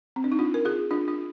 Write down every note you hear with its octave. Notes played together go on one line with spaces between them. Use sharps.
C4
D4
D#4
D4 F4
A#4
F4 G#4
D4 F4
D4 F4